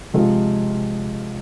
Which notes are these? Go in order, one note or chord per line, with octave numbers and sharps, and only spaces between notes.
C3 F3 G#3 C4 F4